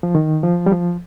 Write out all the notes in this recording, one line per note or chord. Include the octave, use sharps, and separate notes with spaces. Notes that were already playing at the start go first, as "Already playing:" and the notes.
F3
D#3
F3
G3
F3